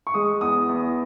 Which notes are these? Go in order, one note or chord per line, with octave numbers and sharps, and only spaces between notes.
C#6
G#3 D#6
E2 D#6
E2